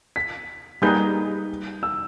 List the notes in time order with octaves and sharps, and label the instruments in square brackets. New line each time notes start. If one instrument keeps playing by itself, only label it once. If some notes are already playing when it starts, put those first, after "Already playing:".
[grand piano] B6
[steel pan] G3 A#3 D#4 G#4 B4 [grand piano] G6
[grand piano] E6